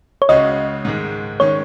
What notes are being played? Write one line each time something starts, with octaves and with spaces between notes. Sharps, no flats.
C#5
C#2 C#3 G#3 C#4 F#4 D#5
G#2 D#3 G#3
D#3 G#3 C#4 C#5